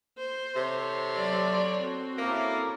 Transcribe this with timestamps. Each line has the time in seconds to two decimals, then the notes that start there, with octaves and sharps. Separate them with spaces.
0.18 C5
0.56 C3 A4 C#5 C6
1.16 F#3 D5
1.79 C4 F#4
2.18 A#3 C#4 E4 A4 A#4 D6